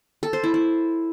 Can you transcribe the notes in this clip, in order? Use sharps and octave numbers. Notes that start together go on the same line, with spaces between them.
A4
C5
E4
E4